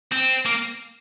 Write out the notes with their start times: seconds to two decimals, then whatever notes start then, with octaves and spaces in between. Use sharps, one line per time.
0.12 C4
0.46 A#3